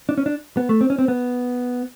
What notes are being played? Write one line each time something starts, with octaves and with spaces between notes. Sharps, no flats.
D4
C#4
D4
B3
A3
C4
C#4
C4
B3